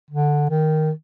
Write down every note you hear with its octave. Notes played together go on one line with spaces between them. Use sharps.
D3
D#3